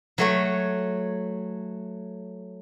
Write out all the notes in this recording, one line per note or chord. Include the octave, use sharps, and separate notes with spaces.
F#3 A3 C#5